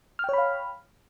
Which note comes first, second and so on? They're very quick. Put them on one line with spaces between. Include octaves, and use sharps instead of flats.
F6 G5 C#5 B5 F5